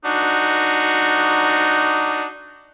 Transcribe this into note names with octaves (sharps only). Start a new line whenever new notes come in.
D4 D#4 F#4